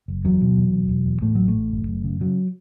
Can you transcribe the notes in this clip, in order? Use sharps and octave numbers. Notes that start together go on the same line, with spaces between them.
F#1
E2 F#3
B2
E2
E1
E1
E2
A2 A3
A1 F#3
A3
A1
F#1
F#2
C#3
C#3 F#3